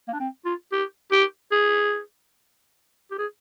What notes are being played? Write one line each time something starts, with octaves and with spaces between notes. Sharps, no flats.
A#3
D4
C4
F4
G4
G4
G#4
G4
G#4